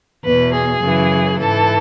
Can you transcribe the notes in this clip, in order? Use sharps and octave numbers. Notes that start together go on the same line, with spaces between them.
E2 B2 B4
G#4
F#2 C#3 E3
G#2 E3 A4